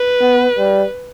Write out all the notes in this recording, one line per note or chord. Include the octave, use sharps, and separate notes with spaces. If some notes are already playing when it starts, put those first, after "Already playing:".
Already playing: B4
B3
G3